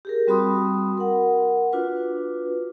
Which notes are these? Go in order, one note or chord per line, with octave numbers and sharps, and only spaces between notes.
G4 G#4 A#4
G3 C4 F#4 B5 C6 D#6
A#4 F#5
D4 F4 F#4 B4